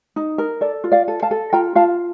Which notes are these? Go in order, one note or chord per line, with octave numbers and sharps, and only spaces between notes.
D#4
A#4
A4 D5
F4
D5 F5
A4
F5 A5
A4
F4 G5 A#5
F4 F5 A5